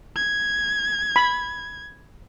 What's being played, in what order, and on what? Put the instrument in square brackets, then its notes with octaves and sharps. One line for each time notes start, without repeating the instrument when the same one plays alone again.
[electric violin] G#6
[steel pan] B5